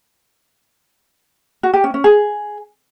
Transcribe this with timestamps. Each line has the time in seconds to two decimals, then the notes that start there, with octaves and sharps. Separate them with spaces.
1.63 F#4
1.74 G4
1.84 C#4
1.94 C#4
2.04 G#4